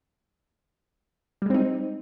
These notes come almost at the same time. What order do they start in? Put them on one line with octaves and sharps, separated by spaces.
G3 G#3 C4 D#4